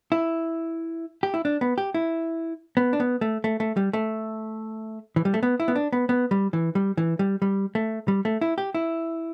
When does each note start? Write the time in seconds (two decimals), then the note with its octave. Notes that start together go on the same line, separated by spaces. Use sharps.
0.12 E4
1.23 G4
1.34 E4
1.45 D4
1.61 B3
1.78 G4
1.94 E4
2.77 B3
2.93 D4
3.00 B3
3.21 A3
3.44 A3
3.60 A3
3.77 G3
3.93 A3
5.16 E3
5.25 G3
5.34 A3
5.43 B3
5.60 E4
5.68 B3
5.76 D4
5.93 B3
6.09 B3
6.31 G3
6.53 E3
6.75 G3
6.97 E3
7.19 G3
7.42 G3
7.75 A3
8.08 G3
8.25 A3
8.41 E4
8.58 G4
8.74 E4